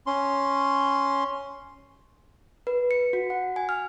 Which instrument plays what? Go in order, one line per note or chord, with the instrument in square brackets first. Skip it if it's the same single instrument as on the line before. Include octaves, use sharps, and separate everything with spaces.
[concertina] C#4 C6
[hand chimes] B4
C#7
F#4
F#5
G#5
F6